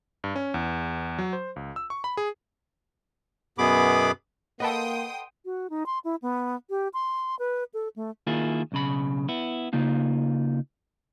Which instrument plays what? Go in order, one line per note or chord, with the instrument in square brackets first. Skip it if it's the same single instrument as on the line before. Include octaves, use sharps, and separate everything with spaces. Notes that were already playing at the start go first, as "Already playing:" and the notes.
[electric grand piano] G2
C#4
E2
F#3
C5
C#2
E6
C#6
B5
G#4
[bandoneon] F#2 B2 B3 G#4 B5 D6
[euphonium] A#3 [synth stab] A4 B4 D#5 [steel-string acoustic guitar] F#5 [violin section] G5 C6 D#6
[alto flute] F#4
D#4
C6
E4
B3
G4
C6
B4
A4
A3
[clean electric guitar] D#3 A#3 E4 F4 G#4
B1 C#3 B5
B3 E4
C#3 A#3 D#4 F4